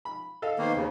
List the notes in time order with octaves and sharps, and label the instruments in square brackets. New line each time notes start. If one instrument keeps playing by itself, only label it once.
[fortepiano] B5
A4 D#5 F5
[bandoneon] D#3 A#3 [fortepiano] B3 C5
[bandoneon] D#2 C#3